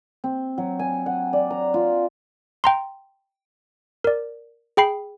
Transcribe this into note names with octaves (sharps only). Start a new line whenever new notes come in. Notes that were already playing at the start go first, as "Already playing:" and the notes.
C4
F#3
G#5
F#5
D5
A#5
F4
G5 A#5 C6
A#4 D5
G#4 G5 B5 C7